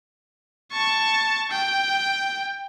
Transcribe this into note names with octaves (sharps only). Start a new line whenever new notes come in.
A5 C#6
G5